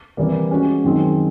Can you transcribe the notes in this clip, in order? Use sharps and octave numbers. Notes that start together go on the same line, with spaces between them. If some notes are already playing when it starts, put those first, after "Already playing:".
C3 E3 G3 A#3
G#3 C#4 F#4
F#2 D#3 G#3 C4